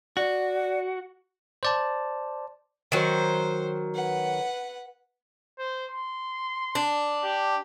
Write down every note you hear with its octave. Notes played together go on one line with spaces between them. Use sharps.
F#4 D5
C5 D5 A5
D#3 F#3 C5
B4 F#5
C5
C6
D4
G4